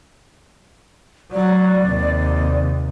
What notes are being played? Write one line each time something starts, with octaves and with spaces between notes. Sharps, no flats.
F#3 D5
D#2 C3